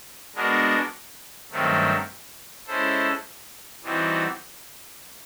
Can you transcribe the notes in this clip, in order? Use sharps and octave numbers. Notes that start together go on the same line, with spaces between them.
G#3 B3 D4 F#4 A#4
G2 D#3 F#3 A3 C4
G#3 C#4 E4 A4 C5
E3 G3 C4 D#4 F#4